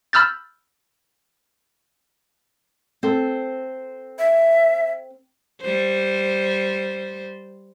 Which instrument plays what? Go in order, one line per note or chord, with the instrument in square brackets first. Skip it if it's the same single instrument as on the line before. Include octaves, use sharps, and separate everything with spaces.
[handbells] B5 E6 F6 G6 A6
[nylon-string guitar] C4 A4 C5
[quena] E5
[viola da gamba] G3 C5